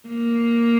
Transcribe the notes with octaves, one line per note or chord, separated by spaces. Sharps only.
A#3